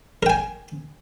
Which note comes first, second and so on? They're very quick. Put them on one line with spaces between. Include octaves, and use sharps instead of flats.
A#4 G5 G#5